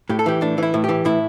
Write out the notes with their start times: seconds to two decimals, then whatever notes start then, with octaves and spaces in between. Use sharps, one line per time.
0.09 A2 G4
0.19 A4
0.26 E3 G4
0.41 A2 D4
0.58 E3 E4
0.74 A2
0.84 E3 G4
1.05 A2 E4